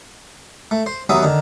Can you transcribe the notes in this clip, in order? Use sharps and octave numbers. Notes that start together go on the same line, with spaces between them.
A3
C5
D#2 F#3 B3 E5 D#6
D3 D#3